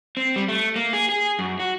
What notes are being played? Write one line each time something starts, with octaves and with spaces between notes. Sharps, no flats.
C4
G3
A3
A#3
G#4
G#4
F#2
F#4